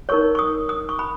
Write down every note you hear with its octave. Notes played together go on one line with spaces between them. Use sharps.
D#4 A#4 C#5 C#6
C#6
D#6
D#6
C#6
B5